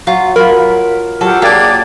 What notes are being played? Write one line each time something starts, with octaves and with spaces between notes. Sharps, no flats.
F#3 F4
F#3 F4 A#4 B5
F#3 F4 G4 A4 F#5
A#3 D4 G4 G#4 D5 G#6